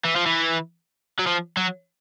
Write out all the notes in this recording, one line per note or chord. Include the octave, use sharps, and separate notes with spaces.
E3
F3
E3
F#3
F3
F#3